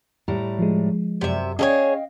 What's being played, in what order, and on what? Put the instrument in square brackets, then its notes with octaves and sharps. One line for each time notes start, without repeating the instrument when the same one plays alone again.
[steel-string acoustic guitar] A2 G3 A#5
[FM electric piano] F3 G#3
[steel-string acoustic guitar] F#2 [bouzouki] C3 E5
[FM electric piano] C#4 [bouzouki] G#4 A4 C#5 [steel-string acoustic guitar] D#5 F5 G5